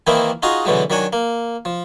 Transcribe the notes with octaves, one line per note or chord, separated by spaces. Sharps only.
D#3 E3 A#3 C4 D#4 E4
D#4 F4 F#4 G#4 D#5 A#5
B2 D3 E3 F#3 G#3
D#3 F#3 D4 F#5 G#5
A#3
F3